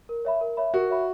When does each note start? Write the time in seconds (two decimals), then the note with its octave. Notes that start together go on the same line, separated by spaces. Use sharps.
0.09 A#4
0.25 C#5 E5 B5
0.41 A#4
0.57 C#5 E5 B5
0.74 F#4 A#4
0.90 C#5 E5 B5